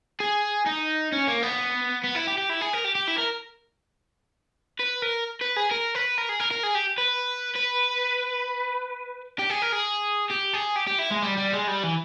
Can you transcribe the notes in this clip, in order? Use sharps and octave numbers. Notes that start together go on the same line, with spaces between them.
G#4
D#4
C#4
A#3
B3
B3
E4
G4
G4
E4
G#4
A#4
G4
G4
E4
A#4
B4
A#4
B4
G#4
A#4
B4
A#4
G#4
A#4
A#4
G#4
G4
B4
B4
G4
G#4
A#4
G#4
G4
G#4
G4
G4
E4
G#3
G3
G3
G#3
G3
E3